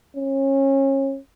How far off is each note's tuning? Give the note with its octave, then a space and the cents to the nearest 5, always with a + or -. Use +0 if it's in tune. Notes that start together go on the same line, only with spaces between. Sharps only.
C#4 -30